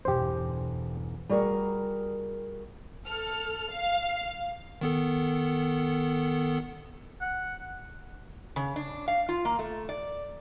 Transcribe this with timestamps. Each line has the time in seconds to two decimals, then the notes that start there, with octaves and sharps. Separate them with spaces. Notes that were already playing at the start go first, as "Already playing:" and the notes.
0.05 G1 E2 B2 G4 C5
1.29 G3 F#4 G#4 A#4
3.07 A4 F6
3.71 F5
4.81 D#3 B3 A4
7.21 F#5
8.56 C#3
8.76 D4
9.08 F5
9.29 F4
9.45 A#3
9.59 A3
9.89 D5